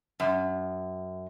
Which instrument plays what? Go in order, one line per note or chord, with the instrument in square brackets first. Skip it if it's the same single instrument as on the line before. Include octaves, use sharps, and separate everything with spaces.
[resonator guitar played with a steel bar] F#2